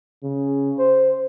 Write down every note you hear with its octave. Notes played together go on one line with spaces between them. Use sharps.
C#3
C5